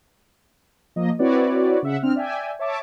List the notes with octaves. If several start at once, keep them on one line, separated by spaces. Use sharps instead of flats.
F3 A#3 D#5
C4 E4 F#4 B4 C#5 D5
C#3 E5 F#5
C4 D4 F6
D5 E5 G5 G#5
C#5 E5 A5 D6